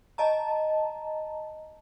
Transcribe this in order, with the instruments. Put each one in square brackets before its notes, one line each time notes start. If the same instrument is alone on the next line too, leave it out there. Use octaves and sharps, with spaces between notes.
[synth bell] D#5 A5 A#5